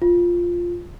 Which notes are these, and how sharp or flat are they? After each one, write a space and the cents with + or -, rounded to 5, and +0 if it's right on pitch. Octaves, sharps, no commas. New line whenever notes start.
F4 +0